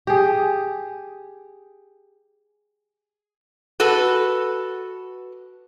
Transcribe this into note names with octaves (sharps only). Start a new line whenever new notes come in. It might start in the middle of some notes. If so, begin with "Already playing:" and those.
G4 G#4
F#4 A4 B4